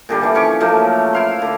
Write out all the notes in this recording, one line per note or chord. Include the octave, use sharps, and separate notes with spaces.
A#2 D3 G3
D3 E3
F3 C#4 C#6 D6
F3 F#3 A3 A#3
E4 F5 C6
D3